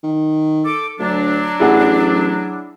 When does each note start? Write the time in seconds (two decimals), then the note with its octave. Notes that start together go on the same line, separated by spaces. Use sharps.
0.03 D#3
0.65 A4 D6
0.99 D2 F#3 D4
1.60 A1 E4 G#4 F#5